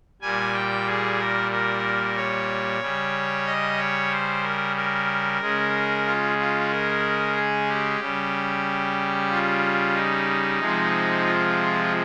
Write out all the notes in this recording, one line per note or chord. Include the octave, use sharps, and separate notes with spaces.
A#2 G3 G#5
G5
G#4
A#4
A#4
C#5
C#3 G3
D#5
C#5
C5
A#4
A#4
C#3 G#3
F4
F4
A#4
G#4
G4
C#3 G3
F4
D#4
C3 F3 G#3
F4